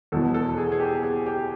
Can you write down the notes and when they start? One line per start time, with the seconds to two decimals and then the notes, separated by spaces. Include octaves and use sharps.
0.12 E2 B2 F#3 A4
0.34 A4
0.58 G#4
0.72 G#4
0.80 G4
1.03 G#4
1.26 G4